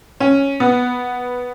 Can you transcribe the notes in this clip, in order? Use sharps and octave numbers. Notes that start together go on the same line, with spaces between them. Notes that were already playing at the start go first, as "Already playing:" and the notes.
C#4
B3